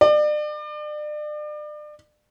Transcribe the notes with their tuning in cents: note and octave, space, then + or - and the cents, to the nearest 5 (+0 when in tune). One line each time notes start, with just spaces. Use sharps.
D5 +35